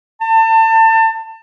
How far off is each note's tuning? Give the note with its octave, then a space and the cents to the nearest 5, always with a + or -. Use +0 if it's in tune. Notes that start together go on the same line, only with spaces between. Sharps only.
A5 +30